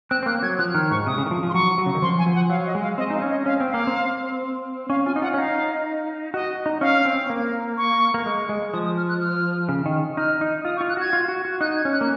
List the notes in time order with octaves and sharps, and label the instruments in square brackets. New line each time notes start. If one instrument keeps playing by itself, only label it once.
[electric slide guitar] C4 [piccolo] F#6
[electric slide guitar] C4
[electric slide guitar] A#3 [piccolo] F#6
[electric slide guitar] F#3 [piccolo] G#6
[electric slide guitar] F3 [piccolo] F#6
[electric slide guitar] D#3 [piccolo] F6
[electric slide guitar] G#2 [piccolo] C#6
[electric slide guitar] C3 [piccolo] D#6
[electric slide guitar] C#3
D#3
F3
F3
[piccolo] C6
[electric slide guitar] F#3 [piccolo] C#6
[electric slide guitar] F#3
C#3
D#3
[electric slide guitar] F3 [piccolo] C6
[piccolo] G#5
[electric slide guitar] F3
[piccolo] F#5
[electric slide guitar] F#3 [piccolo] F5
[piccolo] D#5
[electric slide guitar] G#3
[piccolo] F5
[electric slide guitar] C4 [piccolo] D#5
[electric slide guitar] D#4 [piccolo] F5
[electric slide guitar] C#4
[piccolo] D#5
[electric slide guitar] C#4 [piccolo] F5
[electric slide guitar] C4
[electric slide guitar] A#3 [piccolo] F5
[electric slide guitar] C4
[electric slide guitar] C#4 [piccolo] F5
[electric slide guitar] F4 [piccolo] G#5
[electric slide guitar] D#4
[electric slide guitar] F4 [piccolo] F#5
[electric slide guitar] C#4
[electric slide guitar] D#4 [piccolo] F5
[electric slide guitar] F#4 [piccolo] D#5
[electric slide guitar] D#4
[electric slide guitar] C#4 [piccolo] F5
[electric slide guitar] C4
A#3
[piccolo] C#6
[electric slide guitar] A#3
G#3
G#3
[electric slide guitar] F3 [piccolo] D#6
[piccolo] D#6
F6
F#6
F6
[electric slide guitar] C#3
D#3
[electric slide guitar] D#4 [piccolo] F6
[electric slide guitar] D#4
[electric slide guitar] F4 [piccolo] D#6
[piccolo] C#6
[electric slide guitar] F4
[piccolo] F#6
[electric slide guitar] F#4 [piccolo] G#6
[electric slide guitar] F4
F#4
F#4
[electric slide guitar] D#4 [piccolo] F#6
[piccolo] G#6
[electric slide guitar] C#4
[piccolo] F#6
[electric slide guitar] A#3